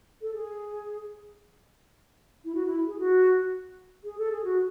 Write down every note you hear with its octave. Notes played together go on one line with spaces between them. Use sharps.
A4
G#4
E4
F#4
E4
G#4
F#4
G#4
A4
G#4
F#4